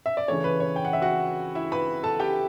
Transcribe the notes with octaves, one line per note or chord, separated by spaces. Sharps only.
E5
D5
C#3 E3 A3 C#5
B4
C#5
G5
F#5
E5
F#4 F#5
E4 E5
B4 B5
A4 A5
G4 G5